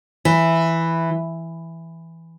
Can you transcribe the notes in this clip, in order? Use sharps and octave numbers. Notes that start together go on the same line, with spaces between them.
E3